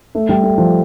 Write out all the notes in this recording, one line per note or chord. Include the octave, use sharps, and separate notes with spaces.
A3
G3
A3
F3